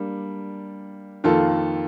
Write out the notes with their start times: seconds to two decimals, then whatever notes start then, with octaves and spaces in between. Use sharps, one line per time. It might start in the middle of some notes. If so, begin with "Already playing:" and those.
Already playing: G3 A#3 D4
1.24 F2 D#3 A#3 F4 A4